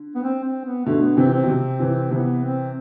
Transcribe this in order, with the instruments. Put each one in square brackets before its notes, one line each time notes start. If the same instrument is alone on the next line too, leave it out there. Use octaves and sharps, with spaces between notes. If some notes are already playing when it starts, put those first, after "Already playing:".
Already playing: [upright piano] D3
[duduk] B3
C4
C4
B3
[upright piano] B2 D3 [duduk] A3
[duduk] B3
[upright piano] C3 E3 [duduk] C4
[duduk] C4
[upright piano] B2
C3
C3 E3
[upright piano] C3 E3 [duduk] B3
[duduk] C4